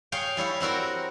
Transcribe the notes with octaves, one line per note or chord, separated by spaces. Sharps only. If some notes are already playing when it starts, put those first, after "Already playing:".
G#4 C#5 F5 G5
G3 E4 C#5 F5
C4 E4 F#4 A#4